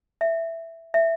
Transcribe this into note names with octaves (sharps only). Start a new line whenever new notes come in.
E5
E5